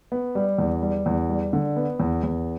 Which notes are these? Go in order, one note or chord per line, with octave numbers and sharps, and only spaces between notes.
B3
G3
E2
G3
E2
G3
D3
B3
E2
E2